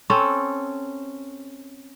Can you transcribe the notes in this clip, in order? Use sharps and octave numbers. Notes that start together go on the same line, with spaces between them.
C4 C#4 A4